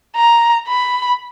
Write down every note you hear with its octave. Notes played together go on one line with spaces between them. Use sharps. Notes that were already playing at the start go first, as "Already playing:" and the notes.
A#5
B5